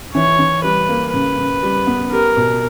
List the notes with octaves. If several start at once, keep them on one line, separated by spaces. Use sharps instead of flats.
E3 C#5
E3
G3 B4
A#3
C#3 B4
C#3
G3
B3
G4 A#4
B2